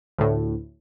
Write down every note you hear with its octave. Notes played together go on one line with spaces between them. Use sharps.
D2 A2